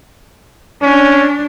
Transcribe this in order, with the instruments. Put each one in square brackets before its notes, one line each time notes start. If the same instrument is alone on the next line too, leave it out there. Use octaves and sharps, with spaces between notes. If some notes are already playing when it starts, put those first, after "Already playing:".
[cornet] C#4 [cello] D4